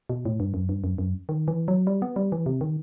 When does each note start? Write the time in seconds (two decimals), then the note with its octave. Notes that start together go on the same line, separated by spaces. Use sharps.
0.10 B2
0.25 A2
0.40 G2
0.54 F#2
0.69 G2
0.84 F#2
0.98 F#2
1.29 D#3
1.48 E3
1.68 F#3
1.87 G3
2.02 B3
2.16 G3
2.32 E3
2.46 C3
2.61 D#3